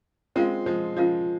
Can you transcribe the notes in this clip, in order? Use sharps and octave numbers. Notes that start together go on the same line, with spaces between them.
G#3 C4 C#4 F4 A#4 F5
F3 G#3
F3 C#4 F4 A#4 F5